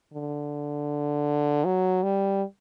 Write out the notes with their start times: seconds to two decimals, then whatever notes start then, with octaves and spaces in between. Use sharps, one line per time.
0.14 D3
1.65 F#3
2.03 G3